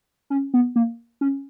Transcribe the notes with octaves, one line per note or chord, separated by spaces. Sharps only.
C#4
B3
A#3
C#4